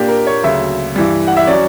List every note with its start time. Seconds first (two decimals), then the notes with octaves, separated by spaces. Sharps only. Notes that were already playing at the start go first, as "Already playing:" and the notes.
Already playing: A#2 A#3 D4 G4
0.08 A#4
0.27 C#5
0.43 D2 C#3 F#3 E5
0.96 G2 E3 G3
1.28 F#5
1.37 E5
1.47 F#3 C#4 D5